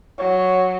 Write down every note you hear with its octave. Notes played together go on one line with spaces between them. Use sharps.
F#3 C#5